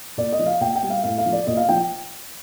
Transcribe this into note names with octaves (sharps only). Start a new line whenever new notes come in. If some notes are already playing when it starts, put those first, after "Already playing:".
A#2 D5
D#5
F3
F5
A#2 G5
G5
G3
F5
A2 F5
F5
F3
D5
A#2 D#5
F5
F3 G5